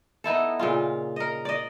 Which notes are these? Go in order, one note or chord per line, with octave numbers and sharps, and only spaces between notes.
B3 D#4 E4 A4
A#2 C#3 F4
A#4 D#5
D5 D#5